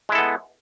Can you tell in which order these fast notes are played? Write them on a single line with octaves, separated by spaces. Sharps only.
G#3 E4 A4 B3